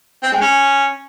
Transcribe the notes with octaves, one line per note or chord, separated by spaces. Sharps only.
C4
G#3
C#4